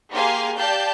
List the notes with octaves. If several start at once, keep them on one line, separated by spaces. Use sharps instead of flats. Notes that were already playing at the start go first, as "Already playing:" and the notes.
A#3 G4 G#4 F5 G#5 C6
G4 D5 F5 A5 G6